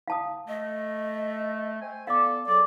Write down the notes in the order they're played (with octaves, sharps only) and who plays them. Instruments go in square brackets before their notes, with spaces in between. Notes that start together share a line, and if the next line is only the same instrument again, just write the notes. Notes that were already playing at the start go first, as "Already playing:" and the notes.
[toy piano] F5 A5 D#6
[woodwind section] A3 [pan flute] D#5
[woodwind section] C5 G5 G#5
[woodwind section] B3 A4 [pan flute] D5 [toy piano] F5 D6
[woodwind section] F#3 G#4 [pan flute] A4 [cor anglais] D5